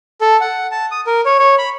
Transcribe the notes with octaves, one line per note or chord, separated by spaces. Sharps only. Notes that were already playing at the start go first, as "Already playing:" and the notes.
A4
F#5
A5
D#6
A#4
C#5
C#5
B5